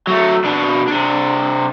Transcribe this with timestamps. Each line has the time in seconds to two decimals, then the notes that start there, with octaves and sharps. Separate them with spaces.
0.07 F#3 A3
0.45 B2 D4
0.88 C3 D4